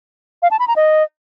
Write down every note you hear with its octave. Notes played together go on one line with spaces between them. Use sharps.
F5
A5
B5
A#5
D#5